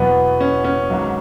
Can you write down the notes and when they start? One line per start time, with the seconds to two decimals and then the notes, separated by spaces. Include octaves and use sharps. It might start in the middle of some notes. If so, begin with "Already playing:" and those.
Already playing: E2 B2 F#3 B3
0.41 C#4
0.64 C#4
0.90 G#1 G#2 F#3